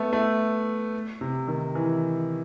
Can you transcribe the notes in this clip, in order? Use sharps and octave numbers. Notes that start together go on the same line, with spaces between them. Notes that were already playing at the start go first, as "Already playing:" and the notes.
Already playing: A3 B3
A3
C3
D#3
E3